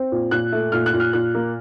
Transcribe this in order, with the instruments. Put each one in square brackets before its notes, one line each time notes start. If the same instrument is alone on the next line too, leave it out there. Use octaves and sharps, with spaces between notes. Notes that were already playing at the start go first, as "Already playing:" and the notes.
Already playing: [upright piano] C4
A#2
A#2 F#6
A3
A#2 F6
F#6
A#2
F6
A#2 F#6
A#3